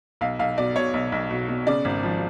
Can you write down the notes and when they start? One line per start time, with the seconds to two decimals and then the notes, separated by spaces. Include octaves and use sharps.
0.21 B1 F5
0.39 B1 F5
0.58 B2 D5
0.76 B2 C#5
0.94 B1
1.12 B1
1.31 B2
1.48 B2
1.67 C#3 D5
1.85 G#1
2.03 F3